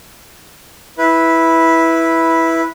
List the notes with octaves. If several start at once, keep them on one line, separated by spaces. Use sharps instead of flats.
E4 B4